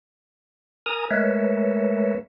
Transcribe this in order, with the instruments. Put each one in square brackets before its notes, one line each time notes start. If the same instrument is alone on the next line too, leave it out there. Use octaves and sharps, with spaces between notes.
[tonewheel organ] A#4 G#5 A#5 D#6
G#3 A3 A#4 B4 C#5 E5